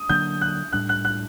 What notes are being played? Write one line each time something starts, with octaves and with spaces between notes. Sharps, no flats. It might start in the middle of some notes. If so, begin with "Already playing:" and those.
Already playing: D#6
D3 F#3 A#3 D4 G6
F#6
A2 G3 D4 F#6
F#6
F#6